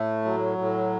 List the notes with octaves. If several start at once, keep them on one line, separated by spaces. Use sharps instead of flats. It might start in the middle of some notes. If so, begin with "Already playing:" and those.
Already playing: A2 A3
F#3
A2